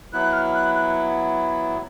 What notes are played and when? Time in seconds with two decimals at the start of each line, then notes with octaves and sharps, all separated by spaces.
0.13 F#3 B3 E4 F#6
0.33 F6
0.54 F#6
0.75 F#6